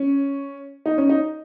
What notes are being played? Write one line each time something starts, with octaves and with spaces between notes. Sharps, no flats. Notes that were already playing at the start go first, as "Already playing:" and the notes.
Already playing: C#4
D#4
C#4
D#4